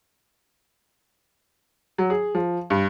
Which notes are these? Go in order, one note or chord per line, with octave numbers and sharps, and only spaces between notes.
F#3
G#4
F3
G2